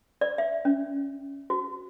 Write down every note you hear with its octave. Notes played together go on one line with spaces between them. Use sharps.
D5
E5
C#4
F#4